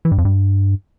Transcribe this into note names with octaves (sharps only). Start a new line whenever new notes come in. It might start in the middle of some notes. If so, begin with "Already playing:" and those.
E3
G2
F2
G2